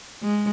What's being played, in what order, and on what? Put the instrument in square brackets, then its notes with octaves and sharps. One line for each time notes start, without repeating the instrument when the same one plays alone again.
[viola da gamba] G#3